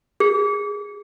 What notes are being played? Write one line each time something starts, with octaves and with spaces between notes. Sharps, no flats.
G#4